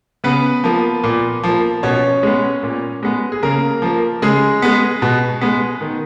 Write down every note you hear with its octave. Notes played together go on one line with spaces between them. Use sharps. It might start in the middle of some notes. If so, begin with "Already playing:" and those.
C#3 B3 B4
F3 A#3
A#2
F3 A#3
B2 C#4 C#5
G#3 B3
A#2
G#3 B3
G#4
C#3 A#3 A#4
F3 A#3
C#3 G#3 G#4
G#3 B3
B2
G#3 B3
D#3